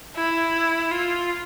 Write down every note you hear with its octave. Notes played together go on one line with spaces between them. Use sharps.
E4
F4